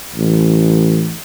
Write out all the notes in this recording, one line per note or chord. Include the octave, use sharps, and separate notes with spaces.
A1